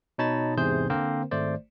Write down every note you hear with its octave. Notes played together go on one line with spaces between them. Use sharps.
B2 D#4 C#5 A5 B5 A6
E2 G#2 C3 G#4 C5 G6
D3 A#3 C4 A#4 C5
G#1 A3 C5 D5